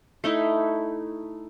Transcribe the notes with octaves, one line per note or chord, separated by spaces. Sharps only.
A3 D#4 E4